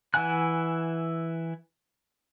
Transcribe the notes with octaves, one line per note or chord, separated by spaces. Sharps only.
E3 E4 F#5 G#5 F#6